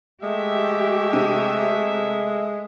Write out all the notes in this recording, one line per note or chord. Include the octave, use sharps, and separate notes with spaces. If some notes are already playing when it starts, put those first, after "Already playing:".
G#3 A3 G4 E5
C3